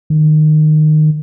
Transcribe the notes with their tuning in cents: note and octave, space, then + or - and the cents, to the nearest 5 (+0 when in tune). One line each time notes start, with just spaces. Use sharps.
D#3 -20